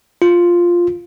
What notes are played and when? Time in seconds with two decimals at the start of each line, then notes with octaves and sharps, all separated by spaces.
0.22 F4